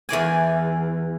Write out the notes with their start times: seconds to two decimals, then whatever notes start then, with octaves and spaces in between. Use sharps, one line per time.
0.09 E2 E3 D5 G#5